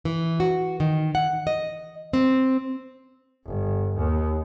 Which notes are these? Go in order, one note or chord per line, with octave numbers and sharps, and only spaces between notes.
E3
F#4
D#3
F#5
D#5
C4
G1
D#2